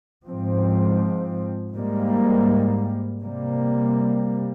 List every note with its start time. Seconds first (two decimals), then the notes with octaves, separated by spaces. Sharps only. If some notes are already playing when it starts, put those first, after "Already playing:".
0.25 G#2 F3 C4
1.74 G#2 G3 A#3
3.23 C3 G3 A#3